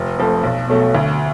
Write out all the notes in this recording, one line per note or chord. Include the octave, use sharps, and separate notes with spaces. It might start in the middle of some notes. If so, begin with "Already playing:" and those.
Already playing: F1
F2 F3 A3
B1
B2 F#3 A3
D2